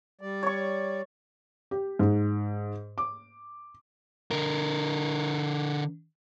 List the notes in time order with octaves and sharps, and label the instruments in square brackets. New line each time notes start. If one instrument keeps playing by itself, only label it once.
[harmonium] G3 D5
[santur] C#5 C#6
[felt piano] G4
G#2
D6
[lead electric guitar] D3 A#4